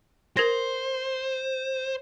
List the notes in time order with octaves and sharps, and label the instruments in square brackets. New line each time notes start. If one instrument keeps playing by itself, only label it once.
[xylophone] A#4 G#6 A#6 [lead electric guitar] C5